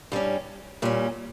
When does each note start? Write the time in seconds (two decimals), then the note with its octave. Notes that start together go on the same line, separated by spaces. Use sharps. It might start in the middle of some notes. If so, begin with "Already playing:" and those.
0.12 G2 G3 C#4
0.82 A#2 G3 C#4